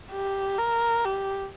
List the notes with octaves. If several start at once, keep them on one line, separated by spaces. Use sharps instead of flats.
G4
A#4
G4